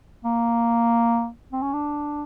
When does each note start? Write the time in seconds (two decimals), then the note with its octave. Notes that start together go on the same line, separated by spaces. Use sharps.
0.25 A#3
1.53 C4
1.62 C#4
1.73 D4